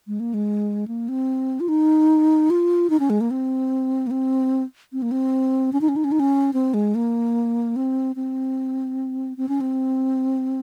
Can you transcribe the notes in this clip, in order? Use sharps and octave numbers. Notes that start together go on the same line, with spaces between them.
G#3
A#3
G#3
A#3
C4
F4
D#4
F4
D#4
C#4
G#3
A#3
C4
A#3
C4
C4
A#3
C4
C#4
D#4
C#4
D#4
C#4
D#4
C#4
C4
G#3
A#3
C4
C4
C4
C#4
C4